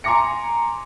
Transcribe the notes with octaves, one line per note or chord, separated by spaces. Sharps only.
G#5 A#5 C6 D6 A#6 C#7